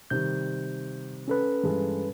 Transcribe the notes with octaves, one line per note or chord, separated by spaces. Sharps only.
C3 D#3 G3 G6
C#4 A4 B4
G2 E3 G#3